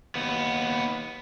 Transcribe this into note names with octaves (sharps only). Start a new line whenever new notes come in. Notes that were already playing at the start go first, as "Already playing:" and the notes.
D#2 B3